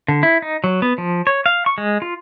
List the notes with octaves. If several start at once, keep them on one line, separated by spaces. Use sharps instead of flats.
D3
E4
D#4
F#3
B3
F3
C#5
F5
C#6
G#3
F4